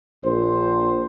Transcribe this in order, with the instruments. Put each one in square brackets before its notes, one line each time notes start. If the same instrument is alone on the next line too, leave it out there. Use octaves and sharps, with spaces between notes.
[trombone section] A#1 C5